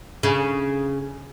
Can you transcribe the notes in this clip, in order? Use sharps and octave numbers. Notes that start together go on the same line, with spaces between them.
C#3